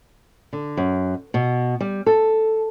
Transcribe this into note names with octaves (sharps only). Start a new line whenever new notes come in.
D3
F#2
B2
G3
A4